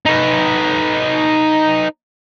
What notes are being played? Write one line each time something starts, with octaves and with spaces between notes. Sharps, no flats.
D#4 B4